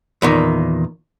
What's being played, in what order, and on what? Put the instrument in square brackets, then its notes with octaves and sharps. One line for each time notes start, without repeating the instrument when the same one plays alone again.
[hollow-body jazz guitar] E2 A#2 D#3